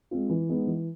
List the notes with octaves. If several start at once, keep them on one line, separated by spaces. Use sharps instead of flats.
G#3 C4 F4
E3
G#3 B3 D#4
E3